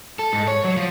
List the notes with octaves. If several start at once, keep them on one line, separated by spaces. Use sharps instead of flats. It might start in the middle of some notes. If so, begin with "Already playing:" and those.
A4
G#2
C#5
F#3
F3